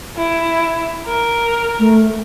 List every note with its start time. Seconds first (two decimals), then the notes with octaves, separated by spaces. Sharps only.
0.17 E4
1.06 A#4
1.79 A3